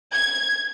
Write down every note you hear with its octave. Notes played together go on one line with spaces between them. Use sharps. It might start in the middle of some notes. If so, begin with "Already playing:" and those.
G#6